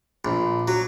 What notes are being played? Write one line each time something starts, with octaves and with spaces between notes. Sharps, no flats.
A#1
F#3